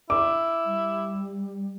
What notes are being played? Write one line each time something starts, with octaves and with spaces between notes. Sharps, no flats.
E4 D6
G3